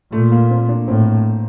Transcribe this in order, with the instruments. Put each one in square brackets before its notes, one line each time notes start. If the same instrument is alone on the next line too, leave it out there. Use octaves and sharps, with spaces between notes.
[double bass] A#2 [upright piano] A3
[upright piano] A#3
C4
D4
[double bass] A2 [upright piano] C4